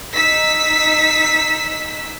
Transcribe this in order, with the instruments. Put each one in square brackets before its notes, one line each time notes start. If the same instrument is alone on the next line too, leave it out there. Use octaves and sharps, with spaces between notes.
[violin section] D#4 E6 B6